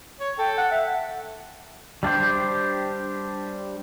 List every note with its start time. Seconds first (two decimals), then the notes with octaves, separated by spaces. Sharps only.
0.20 C#5
0.38 A4 G5
0.58 F#5
0.71 E5
2.03 G3 D4 G4 C5